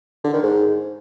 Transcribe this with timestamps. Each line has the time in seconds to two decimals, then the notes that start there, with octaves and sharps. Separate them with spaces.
0.24 D3
0.33 D#3
0.43 G#2